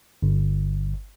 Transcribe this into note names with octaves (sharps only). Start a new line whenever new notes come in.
G1